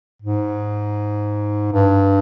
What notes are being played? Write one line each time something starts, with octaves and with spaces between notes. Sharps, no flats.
G#2
G2